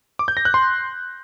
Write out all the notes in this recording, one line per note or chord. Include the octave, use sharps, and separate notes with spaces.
D6
G6
A#6
F#6
C6